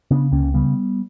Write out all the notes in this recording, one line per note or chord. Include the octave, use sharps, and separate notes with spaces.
C#3 B3 D4
C#2 A#3 C#4
C#3 G3 B3